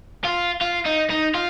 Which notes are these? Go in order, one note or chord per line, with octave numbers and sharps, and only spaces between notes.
F4
F4
D#4
D#4
F4